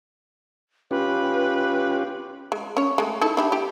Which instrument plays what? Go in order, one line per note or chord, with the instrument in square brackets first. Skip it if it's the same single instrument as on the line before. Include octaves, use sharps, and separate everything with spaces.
[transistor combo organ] C#4 F4 G4 [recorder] B4
[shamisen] G#3
C#4 C#5
G#3 A3
D#4 E4 A4
D4 E4 G4
G4